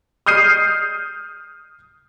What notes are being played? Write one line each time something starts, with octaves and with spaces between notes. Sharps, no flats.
D#6 F6 G6 C7 D#7